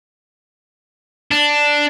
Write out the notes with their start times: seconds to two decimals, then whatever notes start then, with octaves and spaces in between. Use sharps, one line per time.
1.31 D4